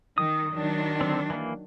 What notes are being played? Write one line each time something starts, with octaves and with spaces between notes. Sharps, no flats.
D#3 D#6
D#3 F#3 D4
D3 C4
E3 A#3